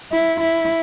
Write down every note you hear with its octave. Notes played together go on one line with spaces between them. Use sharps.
E4
E4